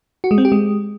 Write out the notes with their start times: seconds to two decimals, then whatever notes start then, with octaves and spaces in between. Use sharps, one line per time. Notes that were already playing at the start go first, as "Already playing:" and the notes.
0.24 F#4
0.31 G#3
0.38 C4
0.45 G4
0.52 G#3